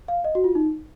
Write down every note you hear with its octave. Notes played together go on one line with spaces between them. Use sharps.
F5
D#5
F#4
F4
D#4